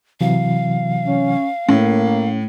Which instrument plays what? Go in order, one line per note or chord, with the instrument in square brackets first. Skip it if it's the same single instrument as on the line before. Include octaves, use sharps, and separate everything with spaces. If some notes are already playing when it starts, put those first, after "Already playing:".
[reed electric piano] C3 E3 F#3 [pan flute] F5
[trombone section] C#4
[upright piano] A2 [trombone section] A#3 [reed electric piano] C#4